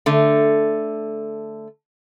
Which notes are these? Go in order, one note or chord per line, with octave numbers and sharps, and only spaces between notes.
D3 A3